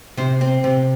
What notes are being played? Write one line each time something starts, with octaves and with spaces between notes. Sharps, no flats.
C3 C5
C4
C3